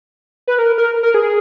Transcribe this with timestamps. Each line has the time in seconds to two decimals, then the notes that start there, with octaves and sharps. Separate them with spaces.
0.47 B4
0.59 A#4
0.78 A#4
1.03 A#4
1.14 G#4